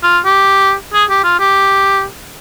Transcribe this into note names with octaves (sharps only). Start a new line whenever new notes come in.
F4
G4
G#4
G4
F4
G4